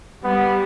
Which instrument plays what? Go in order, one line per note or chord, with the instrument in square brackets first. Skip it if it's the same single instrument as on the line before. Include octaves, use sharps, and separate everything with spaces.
[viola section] G3 [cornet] B3